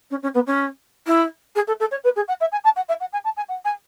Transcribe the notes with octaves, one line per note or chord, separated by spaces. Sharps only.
C#4
C#4
B3
C#4
E4
G#4
A4
A4
C#5
B4
G#4
F#5
E5
G#5
A5
F#5
E5
F#5
G#5
A5
G#5
F#5
G#5